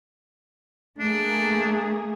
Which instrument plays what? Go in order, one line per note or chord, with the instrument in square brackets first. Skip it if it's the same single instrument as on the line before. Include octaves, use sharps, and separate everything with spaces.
[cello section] A3 A#3 G#4 [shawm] D4